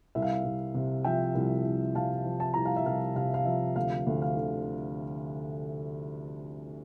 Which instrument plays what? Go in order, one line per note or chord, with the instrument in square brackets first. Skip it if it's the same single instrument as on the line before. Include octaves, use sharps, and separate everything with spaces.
[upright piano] C2 E5
F5
E5
C2
C3
F3 E5 G5
C2
C2
C3 F5 A5
F3
A5
C2 A#5
F5 A5
E5
C2 F5
C3 F5
F5
F3 E5
D2 F5
D2
F5
D3